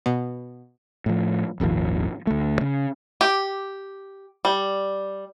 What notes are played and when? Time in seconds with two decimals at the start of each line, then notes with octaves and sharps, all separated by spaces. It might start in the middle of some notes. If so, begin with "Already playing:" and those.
0.06 B2
1.06 A2 F3
1.60 D#1 G#1 D#2 F3
2.27 D2 A3
2.61 C#3
3.21 G4
4.45 G3